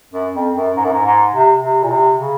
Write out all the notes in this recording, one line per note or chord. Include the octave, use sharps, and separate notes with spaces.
F#2
F2
F#2
G#2
F#2
G#2
G#2
C3
C3
A#2
C3
C#3